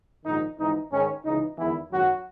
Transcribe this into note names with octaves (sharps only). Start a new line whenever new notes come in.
A#1 G#2 D#3 D#4
G#1 G#2 E3 D#4
G#2 D#3 G#3 C#4
C#2 C#3 E3 D#4
E2 D#3 E3 G#3 B3 E4
G#1 F#2 D#3 F#3 A#3 F#4